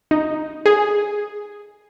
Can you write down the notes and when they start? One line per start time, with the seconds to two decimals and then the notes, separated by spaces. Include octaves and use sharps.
0.11 D#4
0.66 G#4